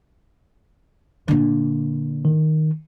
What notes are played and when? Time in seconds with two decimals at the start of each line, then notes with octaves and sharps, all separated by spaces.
1.28 A#2 D3
2.25 D#3